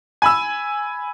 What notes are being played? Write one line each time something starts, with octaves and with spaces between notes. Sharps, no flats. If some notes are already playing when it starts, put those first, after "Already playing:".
G#5 B5 E6